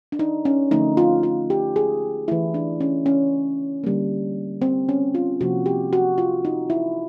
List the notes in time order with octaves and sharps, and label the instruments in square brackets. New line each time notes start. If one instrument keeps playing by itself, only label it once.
[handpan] D4
D#4
C#4
D3 F3 A3 D#4
F4
F4
G4
G#4
E3 A3 E4
D4
C#4
C#4
D3 G3 A#3
C4
C#4
F4
C3 F3 A#3 F#4
G4
F#4
F4
D#4
E4